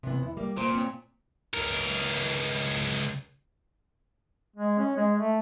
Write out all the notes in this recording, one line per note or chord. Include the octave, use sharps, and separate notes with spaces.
C3 E3 B3
E2 E4
G3 A#3
A#2 C5
C4 C#4
C#2 A#4
G#3
C#4
G#3
A3